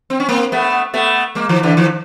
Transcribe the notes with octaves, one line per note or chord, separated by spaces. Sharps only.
C4
C#4
A#3 C4
A3 B3
A3 B3
G#3 A#3
D#3 F3
D3 E3
D#3 F3